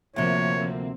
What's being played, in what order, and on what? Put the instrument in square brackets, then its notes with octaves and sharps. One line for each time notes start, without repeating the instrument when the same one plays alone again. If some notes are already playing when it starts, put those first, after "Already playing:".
[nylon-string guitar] D2 C3 [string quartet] F3 [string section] A#3 C4 [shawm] C#5